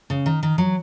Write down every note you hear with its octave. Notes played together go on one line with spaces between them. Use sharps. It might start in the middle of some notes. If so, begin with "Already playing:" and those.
C#3
D#3
D#3
F#3